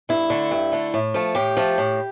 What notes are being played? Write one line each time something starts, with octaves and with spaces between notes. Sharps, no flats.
G2 E4
D3 A3
G2
D3 A3
A2
F3 A3
A2 G4
F3 A3
A2